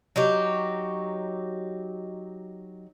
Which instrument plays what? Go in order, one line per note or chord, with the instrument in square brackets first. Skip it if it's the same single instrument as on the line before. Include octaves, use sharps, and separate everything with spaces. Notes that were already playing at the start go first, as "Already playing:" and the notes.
[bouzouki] F#3 D#4 G4